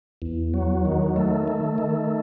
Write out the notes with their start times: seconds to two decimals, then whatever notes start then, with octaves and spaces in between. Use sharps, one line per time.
0.22 E2
0.54 F#3
0.85 D#3
1.16 A3
1.48 A3
1.78 D#3